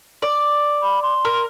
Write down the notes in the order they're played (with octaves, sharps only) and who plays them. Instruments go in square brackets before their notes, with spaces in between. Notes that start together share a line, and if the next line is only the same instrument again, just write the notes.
[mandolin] D5
[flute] B5
C6
[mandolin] A#4